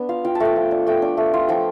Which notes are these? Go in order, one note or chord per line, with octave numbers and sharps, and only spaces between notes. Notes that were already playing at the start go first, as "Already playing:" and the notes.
Already playing: B3 D4
F4 F5
F4 G5
A5
A3 G5
F3
D4
A3 G5
D4
A3
F4
F3 G5